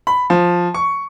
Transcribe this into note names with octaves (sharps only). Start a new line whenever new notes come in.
B5
F3
C#6